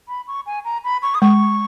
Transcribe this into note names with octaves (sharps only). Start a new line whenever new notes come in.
B5
C#6
G#5
A#5
B5
C#6
D#6
G#3 C#6